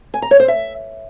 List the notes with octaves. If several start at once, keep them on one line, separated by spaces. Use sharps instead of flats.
G#5
A#5
C#5
C5
E5